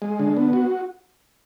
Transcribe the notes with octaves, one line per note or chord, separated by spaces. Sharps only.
G#3
D3
B3
F#4